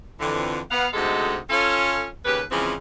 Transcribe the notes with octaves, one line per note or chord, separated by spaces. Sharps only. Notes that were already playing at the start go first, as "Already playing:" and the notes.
F2 D3 E3
B3 F5 F#5
D2 C3 G#3 D#4 F#4 A4
C#4 F4 A4
D#2 C#3 G4 B4
C#3 E3 F3 G#3 C4